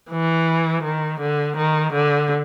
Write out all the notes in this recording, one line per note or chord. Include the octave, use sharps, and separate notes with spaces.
E3
D#3
D3
D#3
D3